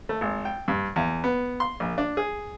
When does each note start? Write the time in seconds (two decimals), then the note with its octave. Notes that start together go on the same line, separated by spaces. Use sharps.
0.09 A3
0.21 G#1
0.45 G5
0.68 G2
0.96 E2
1.24 B3
1.60 C6
1.80 A#1
1.98 D4
2.17 G#4